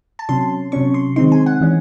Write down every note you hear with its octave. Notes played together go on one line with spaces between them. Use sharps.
A5
C3 F#3 C#4 C6
C3 F#3 C#4 C#6
C6
D#3 G#3 C4 D#4 C6
G#5
F#5
E3 G#3 C#4